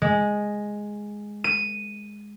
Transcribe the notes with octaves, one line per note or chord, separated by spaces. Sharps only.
G#3
D#7